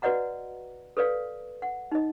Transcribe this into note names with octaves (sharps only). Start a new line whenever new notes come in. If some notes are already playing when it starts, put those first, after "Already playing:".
F#4 B4 D5 D#5 F#5 A#5
A4 B4 D5 F5
F#5
D#4 D#5